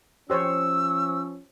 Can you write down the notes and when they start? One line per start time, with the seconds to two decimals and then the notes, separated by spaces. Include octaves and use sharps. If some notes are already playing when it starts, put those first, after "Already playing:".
0.30 F3 C#4 G4 C5 C#5 E6